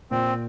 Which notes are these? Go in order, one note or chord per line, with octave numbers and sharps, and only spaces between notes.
A#2 C4